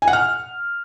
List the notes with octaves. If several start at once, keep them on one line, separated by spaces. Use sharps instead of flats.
G#5
F#5
F6